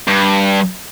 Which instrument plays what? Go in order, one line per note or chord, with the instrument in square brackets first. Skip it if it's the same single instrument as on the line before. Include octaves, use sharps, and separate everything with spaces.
[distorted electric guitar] G2